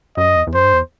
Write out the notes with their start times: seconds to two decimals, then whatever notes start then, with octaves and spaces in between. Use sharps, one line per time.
0.17 F#2 D#5
0.36 E2
0.47 E2
0.54 F#2 C5
0.64 G2
0.73 E2